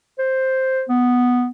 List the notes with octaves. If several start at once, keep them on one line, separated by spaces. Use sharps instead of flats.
C5
B3